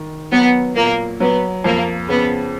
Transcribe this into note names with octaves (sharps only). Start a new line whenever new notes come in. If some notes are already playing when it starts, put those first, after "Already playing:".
Already playing: D#3
F#3 B3
A#2 A#3
F#3 B3
F2 A#3
C#3 B3